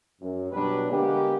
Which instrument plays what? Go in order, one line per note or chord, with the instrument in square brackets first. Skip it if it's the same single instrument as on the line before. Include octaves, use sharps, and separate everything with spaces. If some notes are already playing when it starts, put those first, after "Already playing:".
[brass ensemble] F#2
B2 F#3 G3 D4 B4
D3 G#3 A#3 B3 G4